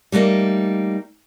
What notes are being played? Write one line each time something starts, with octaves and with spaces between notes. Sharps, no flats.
G3 A3 A#3 D#4